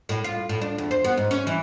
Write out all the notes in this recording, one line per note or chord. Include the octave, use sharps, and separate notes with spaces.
A2
F4
A2
D4
E2
C5
B3
G#2
C#4
E3